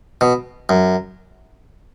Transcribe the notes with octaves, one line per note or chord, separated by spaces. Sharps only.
B2
F#2